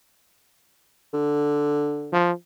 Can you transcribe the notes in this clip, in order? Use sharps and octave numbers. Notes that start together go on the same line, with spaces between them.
D3
F3